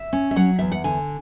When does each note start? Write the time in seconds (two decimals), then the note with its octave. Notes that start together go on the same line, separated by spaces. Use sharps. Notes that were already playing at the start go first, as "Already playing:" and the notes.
Already playing: E5
0.13 C#4
0.31 E5
0.36 F#3 F#5
0.59 E2 E5
0.72 F#5
0.84 D3 G#5